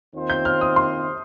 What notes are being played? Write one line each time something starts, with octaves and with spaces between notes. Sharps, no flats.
D#2 D#3 C4 F4 C5
G6
F6
D#6
C6